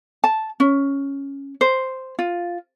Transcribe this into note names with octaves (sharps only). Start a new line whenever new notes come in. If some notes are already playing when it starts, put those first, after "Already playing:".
A5
C#4
C5
F4